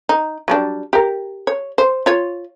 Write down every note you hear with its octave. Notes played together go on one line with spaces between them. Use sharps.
D#4
F#3 G3 D4
G4 A#4
C#5
C5
F4 C#5